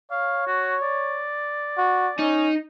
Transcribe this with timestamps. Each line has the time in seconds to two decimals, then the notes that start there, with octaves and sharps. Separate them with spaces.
0.11 C#5 F5
0.47 F#4
0.82 D5
1.78 F#4
2.19 C#4 D#4